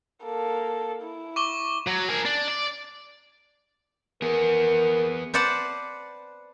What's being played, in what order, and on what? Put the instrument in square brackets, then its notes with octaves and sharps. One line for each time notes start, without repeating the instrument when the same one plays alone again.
[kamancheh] A#3 A4
E4
[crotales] C#6 D6 G7
[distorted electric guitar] F#3
G#4 A#4
D4
D5
[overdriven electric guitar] B3 G#4 [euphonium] A#4
[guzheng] B4 C5 D5 F#5 A5